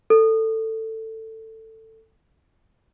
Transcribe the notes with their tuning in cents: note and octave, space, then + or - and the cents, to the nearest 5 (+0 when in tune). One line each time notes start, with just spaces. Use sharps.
A4 +15